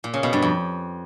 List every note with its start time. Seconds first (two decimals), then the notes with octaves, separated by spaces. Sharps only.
0.04 A#2
0.14 C#3
0.23 B2
0.33 G2
0.42 F2